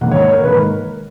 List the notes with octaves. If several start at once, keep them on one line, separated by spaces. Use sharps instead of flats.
G#2 D#3 A#3 F#5
C#5
C#5
A#4
G#2 D#3 A#3 B4
A#4